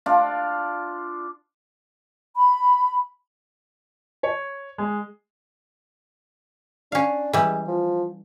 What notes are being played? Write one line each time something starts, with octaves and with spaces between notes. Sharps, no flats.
D4 F4
B5
C#5
G#3
C#4 D4 F5
E3 G3 G#3
F3